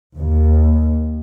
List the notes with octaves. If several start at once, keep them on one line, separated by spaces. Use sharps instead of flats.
D#2